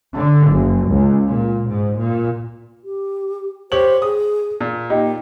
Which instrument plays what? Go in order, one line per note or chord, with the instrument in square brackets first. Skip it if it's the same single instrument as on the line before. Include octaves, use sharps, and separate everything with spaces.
[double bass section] D3
F#1
C#2
A#2
G#2
A#2
[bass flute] G4
[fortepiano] G4 C#5 C#6 [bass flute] C5 [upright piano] F#7
[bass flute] G#4 [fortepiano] D#6
[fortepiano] A#2
[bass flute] A#3 [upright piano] D#4 G4